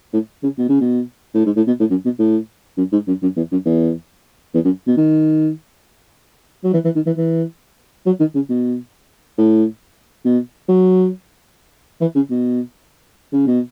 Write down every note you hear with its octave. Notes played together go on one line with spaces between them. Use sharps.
A2
C#3
B2
C#3
B2
A2
G#2
A2
B2
A2
F#2
B2
A2
F#2
G#2
F#2
F#2
E2
F#2
E2
E2
F#2
B2
D#3
F#3
E3
E3
D#3
E3
E3
F#3
D#3
C#3
B2
A2
B2
F#3
E3
C#3
B2
C#3
B2